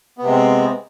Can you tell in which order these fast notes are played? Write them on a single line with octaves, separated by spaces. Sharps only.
B3 C3 G#3 C4